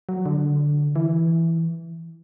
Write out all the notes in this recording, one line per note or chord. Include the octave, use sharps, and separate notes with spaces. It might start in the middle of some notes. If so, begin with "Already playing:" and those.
F#3
D3
E3